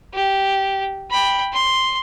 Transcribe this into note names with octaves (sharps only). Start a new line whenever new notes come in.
G4
G5 B5
C6